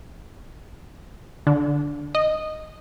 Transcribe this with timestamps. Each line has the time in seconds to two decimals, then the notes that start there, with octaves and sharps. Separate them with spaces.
1.47 D3
2.15 D#5